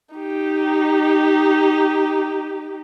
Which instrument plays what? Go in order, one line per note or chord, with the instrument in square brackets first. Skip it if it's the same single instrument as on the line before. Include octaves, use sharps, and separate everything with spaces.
[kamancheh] D#4 G4